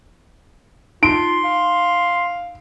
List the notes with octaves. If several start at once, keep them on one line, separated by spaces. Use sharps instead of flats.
D#4 F4 C6 D7
F5